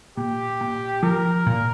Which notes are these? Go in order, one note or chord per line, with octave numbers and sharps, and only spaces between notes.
A#2 G4
A#2
F3 A#4
A#2